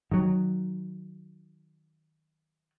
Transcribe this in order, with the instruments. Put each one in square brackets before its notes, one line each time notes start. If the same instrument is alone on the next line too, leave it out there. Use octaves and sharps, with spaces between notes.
[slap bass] D#3 F#3